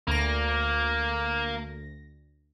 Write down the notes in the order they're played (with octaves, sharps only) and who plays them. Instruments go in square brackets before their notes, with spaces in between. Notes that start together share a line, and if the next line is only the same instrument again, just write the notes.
[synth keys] D2 A#6 [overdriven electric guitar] A#3